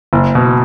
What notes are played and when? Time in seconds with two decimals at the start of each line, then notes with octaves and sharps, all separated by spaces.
0.13 F#1
0.35 B2